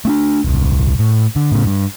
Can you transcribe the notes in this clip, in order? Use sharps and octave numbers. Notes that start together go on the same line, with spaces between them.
A3 C#4 D4
D#1 C2
A2
D3
A2 C#3
G2